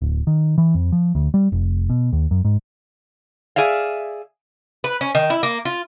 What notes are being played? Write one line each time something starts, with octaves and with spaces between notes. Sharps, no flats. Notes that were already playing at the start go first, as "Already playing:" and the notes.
D1
D#3
E3
F2
F3
D2
G3
F1
B2
D#2
F#2
G#2
G#4 D5 E5 F5
B4
C#4
D#3
E4
A#3
F4